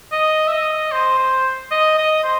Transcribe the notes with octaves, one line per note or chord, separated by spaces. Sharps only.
D#5
E5
D#5
C5
C5
D#5
D#5
C5